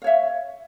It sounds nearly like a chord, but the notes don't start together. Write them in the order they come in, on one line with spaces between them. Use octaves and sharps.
F5 C#5 E5